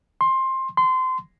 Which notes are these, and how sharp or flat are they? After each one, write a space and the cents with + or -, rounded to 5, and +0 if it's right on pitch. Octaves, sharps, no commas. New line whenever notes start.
C6 +15
C6 -25